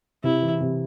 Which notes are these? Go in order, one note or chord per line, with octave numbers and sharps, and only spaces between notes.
C3 E4
E3
C3